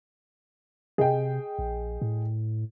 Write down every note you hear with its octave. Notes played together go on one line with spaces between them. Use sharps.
C3 G#4 D#5 G5
A#1
A2